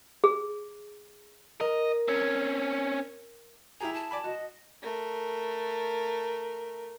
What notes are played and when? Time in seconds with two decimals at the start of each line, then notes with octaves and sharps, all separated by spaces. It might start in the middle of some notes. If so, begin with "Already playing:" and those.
0.24 G#4
1.61 A#4 D#5
2.08 C4 C#4
3.80 E4 G4 G#4 A#5
3.94 A5
4.11 D5 G#5 B5
4.24 F#4 D#5
4.82 A3 A#4